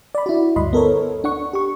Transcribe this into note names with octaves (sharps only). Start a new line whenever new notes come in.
D5 B5
E4 F#4
D2 G2 D#5 B5 C6
B3 A4 A#4 C#5
D4 F#5 C#6
G4 C#6